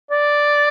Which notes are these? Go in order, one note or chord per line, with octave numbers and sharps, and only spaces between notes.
D5